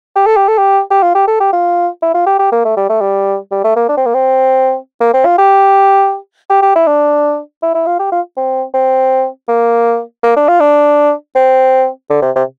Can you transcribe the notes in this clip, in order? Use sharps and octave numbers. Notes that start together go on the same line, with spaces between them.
G4
A4
G4
A4
G4
G4
F4
G4
A4
G4
F4
E4
F4
G4
G4
A#3
A3
G3
A3
G3
G3
A3
A#3
D4
C4
A#3
C4
A#3
C4
F4
G4
G4
G4
E4
D4
E4
E4
F4
G4
F4
C4
C4
A#3
A#3
D4
F4
D4
C4
D3
C3
C3